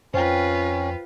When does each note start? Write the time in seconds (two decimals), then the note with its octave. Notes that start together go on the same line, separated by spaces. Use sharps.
0.14 F2 C#4 F4 B4 C5 G5